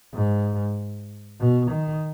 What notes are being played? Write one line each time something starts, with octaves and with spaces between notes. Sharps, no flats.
G#2
B2
D#3